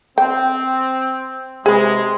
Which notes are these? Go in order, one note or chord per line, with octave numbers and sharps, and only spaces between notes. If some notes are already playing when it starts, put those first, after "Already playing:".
C4 G5
C3 G#3 G#4 B4